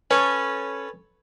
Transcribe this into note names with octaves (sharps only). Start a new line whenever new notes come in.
C#4 A4 B4 C#5